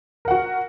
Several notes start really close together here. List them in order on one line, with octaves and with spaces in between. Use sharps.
A#4 F#5 F#4